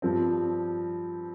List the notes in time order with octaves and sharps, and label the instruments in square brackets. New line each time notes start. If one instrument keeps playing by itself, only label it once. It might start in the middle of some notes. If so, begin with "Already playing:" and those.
[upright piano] G2 F3 C4